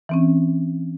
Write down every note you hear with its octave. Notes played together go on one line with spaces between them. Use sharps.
E3 C4 C#4